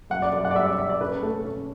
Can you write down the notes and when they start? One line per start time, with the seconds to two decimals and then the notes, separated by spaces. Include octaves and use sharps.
0.10 F#2 F#5
0.22 D5
0.32 F#2 D5
0.45 F#5
0.51 D5
0.55 G3 E5
0.66 D5
0.77 G3 E5
0.90 D5
1.01 C#4 B4
1.23 A3 A4
1.45 C#4